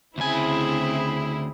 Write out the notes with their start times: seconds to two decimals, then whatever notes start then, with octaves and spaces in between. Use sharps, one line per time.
0.18 D2 C#3 C4 E4 G#4 G#5